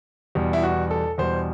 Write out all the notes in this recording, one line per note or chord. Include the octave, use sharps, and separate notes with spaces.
E2 B2 G3
E4
F#4
A4
E2 B2 G3 C5